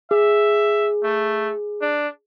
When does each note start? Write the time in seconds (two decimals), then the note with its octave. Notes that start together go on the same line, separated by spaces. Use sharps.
0.11 G#4 E5
1.04 A3
1.82 D4